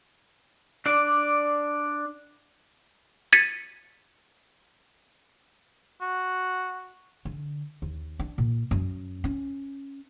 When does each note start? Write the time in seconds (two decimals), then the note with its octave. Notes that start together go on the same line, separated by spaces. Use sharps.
0.86 D4 D5
3.33 G#6 A6 B6 C#7 D#7
6.01 F#4
7.25 D3
7.82 D#2
8.19 D4
8.38 A#2
8.71 F#2
9.24 C#4